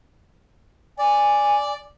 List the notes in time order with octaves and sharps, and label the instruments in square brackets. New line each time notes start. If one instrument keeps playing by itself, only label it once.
[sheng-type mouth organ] D5 [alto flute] G#5